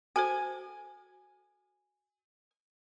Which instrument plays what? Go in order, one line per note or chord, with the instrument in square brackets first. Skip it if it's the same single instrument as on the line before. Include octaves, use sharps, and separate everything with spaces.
[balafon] F#4 A4 C5 [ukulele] G#5